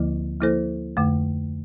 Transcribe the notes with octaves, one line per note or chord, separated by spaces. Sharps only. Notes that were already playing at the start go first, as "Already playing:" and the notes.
Already playing: D2 D3 F3 A#3 E4
F3 A#3 E4 A4 C5
F2 D3 A3